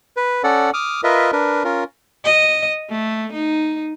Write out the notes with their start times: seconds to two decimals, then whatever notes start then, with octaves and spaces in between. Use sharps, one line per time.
0.17 B4
0.44 C#4 A4 D5 F#5
0.74 D6 D#6 F6
1.04 F4 A#4 B4 D#5 E5
1.33 D4 A#4 B4
1.64 C#4 F4 A#4
2.24 D#5
2.90 A3
3.33 D#4